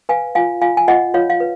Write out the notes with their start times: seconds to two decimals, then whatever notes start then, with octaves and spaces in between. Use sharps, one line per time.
0.09 B4 F5 G#5
0.35 F4 F5 G#5
0.61 F4 F5 G#5
0.77 G#5
0.88 F4 D#5 F#5
1.14 F4 C#5 F5
1.30 F5
1.40 B4